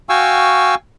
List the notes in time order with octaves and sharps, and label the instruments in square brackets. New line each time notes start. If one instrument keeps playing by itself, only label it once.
[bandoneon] F#4 F5 G5 G#5 C#6 E6